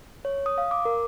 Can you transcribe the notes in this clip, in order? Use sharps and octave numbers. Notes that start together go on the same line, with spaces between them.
C#5
D#6
F5
D6
A#4